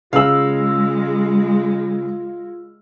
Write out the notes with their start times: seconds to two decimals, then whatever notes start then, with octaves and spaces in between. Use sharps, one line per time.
0.13 C#3 G#3 F4 F5 E6 F#7